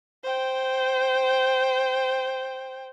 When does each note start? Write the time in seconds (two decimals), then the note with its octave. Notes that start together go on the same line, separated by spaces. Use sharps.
0.23 C5 G5